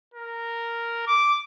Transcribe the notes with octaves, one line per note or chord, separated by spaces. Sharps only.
A#4
D6